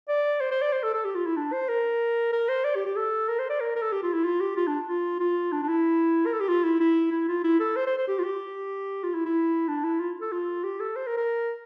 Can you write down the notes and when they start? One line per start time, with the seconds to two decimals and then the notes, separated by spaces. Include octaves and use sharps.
0.08 D5
0.40 C5
0.51 C5
0.62 D5
0.72 C5
0.83 A4
0.94 A4
1.04 G4
1.15 F4
1.26 E4
1.36 D4
1.53 C5
1.68 A#4
2.32 A#4
2.48 C5
2.64 D5
2.75 G4
2.85 G4
2.96 A4
3.29 A#4
3.39 C5
3.50 D5
3.60 A#4
3.76 A#4
3.82 A4
3.92 G4
4.03 F4
4.13 E4
4.24 F4
4.40 G4
4.56 F4
4.67 D4
4.88 F4
5.20 F4
5.52 D4
5.63 D4
5.68 E4
6.26 A#4
6.33 A4
6.40 G4
6.48 F4
6.64 E4
6.80 E4
7.12 E4
7.28 F4
7.44 E4
7.60 A4
7.76 C5
7.86 C5
7.97 C5
8.08 G4
8.19 F4
8.24 G4
9.04 F4
9.14 E4
9.25 E4
9.68 D4
9.84 E4
10.00 F4
10.21 A4
10.32 F4
10.64 G4
10.80 A4
10.96 C5
11.07 A#4
11.17 A#4